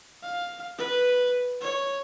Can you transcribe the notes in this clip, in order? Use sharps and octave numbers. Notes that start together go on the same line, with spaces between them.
F5
B4
C#5